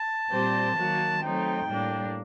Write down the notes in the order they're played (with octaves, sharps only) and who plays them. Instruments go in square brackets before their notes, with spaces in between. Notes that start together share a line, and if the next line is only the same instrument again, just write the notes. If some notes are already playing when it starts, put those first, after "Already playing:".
Already playing: [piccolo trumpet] A5
[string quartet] A#2 G3 C4 G4 C5
D#3 F#3 A#3 F#4
[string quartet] F#3 A3 C4 D#4 [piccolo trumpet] G5
[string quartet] A2 G3 A#3 D4